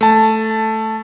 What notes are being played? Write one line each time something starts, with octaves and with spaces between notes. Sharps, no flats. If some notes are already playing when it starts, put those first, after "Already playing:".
A3 A5